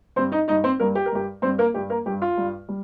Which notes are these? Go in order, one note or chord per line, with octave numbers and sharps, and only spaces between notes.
G2 G3 C4 C5
D#4 D#5
G2 G3 D#4 D#5
C4 C5
G2 G3 A#3 A#4
G4
A#4
G2 G3 G4
G2 G3 C4 C5
A#3 A#4
G2 G3 G4
A#3 A#4
G2 G3 G4
F4
G2 G3
G3